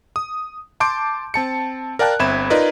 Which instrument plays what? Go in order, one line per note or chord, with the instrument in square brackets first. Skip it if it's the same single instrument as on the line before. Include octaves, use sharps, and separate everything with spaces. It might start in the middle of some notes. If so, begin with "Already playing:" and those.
[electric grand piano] D#6
A5 C6 D6 G6 D7
C4 A5 C#7
A#4 D5 F5 G5 A5 F#6
G1 C4 E5 B5 G#6 E7
D#4 F4 A#4 B4 D5 D#5